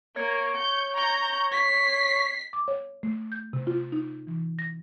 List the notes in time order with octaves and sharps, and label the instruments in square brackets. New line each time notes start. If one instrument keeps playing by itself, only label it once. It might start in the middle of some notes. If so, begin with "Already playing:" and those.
[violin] A#3 [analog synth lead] C#5
[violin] G6
A#5 G6
B6 C7
[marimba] D6
C#5
A3
G6
C3
F4
D#4
E3
A#6